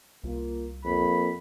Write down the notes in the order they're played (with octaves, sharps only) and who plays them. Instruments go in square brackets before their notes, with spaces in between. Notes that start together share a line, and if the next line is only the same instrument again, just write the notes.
[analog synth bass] C2 [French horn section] A#3 F4
[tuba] F2 [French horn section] A#3 [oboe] B5